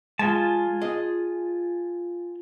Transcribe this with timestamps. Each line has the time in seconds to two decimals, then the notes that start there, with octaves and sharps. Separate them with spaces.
0.19 G#3 F4 G#5 A5
0.82 G#4 D#5